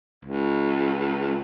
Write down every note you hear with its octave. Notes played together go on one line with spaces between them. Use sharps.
C#2